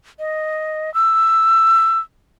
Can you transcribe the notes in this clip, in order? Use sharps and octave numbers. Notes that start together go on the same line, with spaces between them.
D#5
E6